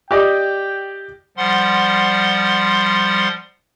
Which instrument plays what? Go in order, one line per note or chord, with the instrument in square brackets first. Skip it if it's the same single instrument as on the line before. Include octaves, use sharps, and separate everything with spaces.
[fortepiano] G4 D5 D#5 [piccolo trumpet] G5
[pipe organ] F3 G3 F#5 C6